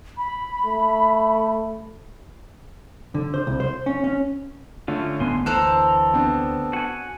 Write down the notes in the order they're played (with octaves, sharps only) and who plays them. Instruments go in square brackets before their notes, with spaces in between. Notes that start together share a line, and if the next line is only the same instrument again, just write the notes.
[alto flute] B5
[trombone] A3
[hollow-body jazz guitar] D3
C5
C2
C5
C#4
C#4
[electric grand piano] D3 A3 [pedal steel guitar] C#4 F4
[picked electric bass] G#1 B3 [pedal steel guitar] G#5 C6
[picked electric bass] D2 [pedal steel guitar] E3 A#5 [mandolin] A4 C5 [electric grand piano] F6 F#6
[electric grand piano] B3 C4 D4
[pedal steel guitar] F#4 G#5